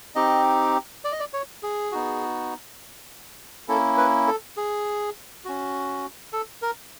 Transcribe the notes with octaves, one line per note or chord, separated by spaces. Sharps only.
C4 D#4 G4 D#5
D5
D#5
D5
C#5
G#4
B3 D#4 F#4
A#3 C#4 E4 A4
B4
A4
G#4
C#4 F#4
A4
A#4